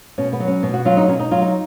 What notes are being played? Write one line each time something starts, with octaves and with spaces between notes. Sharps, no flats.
B2 C#4
B3
F#3
C#4
B2
F#4
F#3 F4
D#4
B2 C#4
D#4
F#3 F4
D#4